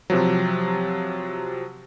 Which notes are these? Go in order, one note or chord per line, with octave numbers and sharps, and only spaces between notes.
C3 F3 F#3